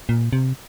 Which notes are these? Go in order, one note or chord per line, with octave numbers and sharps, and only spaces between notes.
A#2
C3